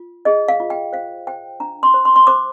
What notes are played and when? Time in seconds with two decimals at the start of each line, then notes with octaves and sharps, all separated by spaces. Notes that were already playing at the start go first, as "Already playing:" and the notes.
Already playing: F4
0.25 G#4 D#5
0.48 F5
0.60 F4
0.70 G5
0.93 C5 F5
1.27 C5 G5
1.60 D4 A#5
1.83 C6
1.94 C5
2.05 C6
2.16 C6
2.27 C5 D6